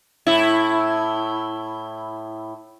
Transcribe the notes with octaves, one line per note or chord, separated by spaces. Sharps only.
A2 E4